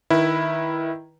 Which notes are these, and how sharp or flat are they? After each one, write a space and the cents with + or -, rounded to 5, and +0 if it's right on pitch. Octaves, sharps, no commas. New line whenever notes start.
D#3 +0 E4 +0 B4 -25